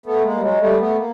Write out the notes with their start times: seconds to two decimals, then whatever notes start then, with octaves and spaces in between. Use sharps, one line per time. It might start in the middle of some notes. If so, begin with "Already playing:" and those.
0.06 A3 B3
0.24 G#3 A#3
0.36 G3
0.42 F#3 G#3
0.61 G3 A3
0.80 A3 B3
0.98 A#3